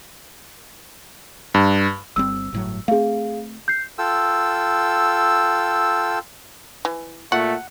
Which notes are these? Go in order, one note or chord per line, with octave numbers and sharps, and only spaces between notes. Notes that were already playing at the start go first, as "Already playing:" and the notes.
G2
G1 G3 C4 E6
G1 A2 F#3
A3 C4 G#4 F5
G6 C7
F4 A4 G5 E6
E3
A#2 A3 F#4 F#5